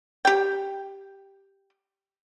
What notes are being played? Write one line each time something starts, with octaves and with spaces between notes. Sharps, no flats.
G4 G5